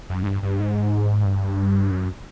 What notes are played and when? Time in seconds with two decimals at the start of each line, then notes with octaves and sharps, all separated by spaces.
0.10 F#2
0.23 G#2
0.26 G2
0.43 G2
0.60 G#2
1.25 G2
1.91 F#2